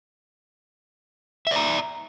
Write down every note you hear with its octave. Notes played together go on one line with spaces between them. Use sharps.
D5 E5 A#5